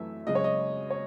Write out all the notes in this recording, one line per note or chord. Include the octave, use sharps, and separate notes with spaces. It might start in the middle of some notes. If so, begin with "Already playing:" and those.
Already playing: F#2 E3 A3 E5
F#2 C#3 G#3 D#5
C#5
D#5
C#5